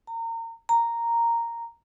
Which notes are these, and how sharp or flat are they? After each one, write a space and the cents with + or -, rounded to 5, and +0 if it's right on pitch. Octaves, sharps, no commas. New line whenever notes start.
A#5 -30
A#5 -5